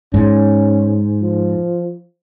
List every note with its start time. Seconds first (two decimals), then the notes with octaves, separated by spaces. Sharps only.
0.14 G#2 C#4
1.22 F3